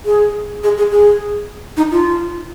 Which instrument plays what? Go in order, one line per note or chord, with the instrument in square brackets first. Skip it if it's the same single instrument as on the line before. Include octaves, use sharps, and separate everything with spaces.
[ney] G#4
G#4
G#4
G#4
D#4
F4